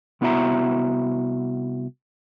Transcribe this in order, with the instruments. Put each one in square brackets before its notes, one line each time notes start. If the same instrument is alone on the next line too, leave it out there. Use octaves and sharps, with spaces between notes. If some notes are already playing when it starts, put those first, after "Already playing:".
[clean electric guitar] C2 B3 E4 F#4 E5 A#5